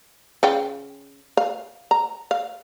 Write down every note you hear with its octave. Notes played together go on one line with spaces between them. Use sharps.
C#3 F4 G5
F5
A#5
F5